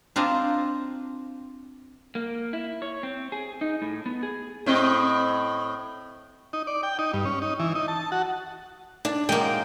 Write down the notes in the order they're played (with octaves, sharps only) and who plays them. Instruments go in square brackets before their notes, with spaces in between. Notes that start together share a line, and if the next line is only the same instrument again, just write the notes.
[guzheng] C4 D4 F4 D#5 A#5
[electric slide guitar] A#3
E4
C#5
C4
G#4
D#4
A2
B3
G#4
[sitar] A2 C4 D#5
[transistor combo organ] D#4
D5
G5
D#4
G2
C#4
D#4
E3
D#4
A5
F#4
[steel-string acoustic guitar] D4
[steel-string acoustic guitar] F#2 G5 [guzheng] G#3 A#3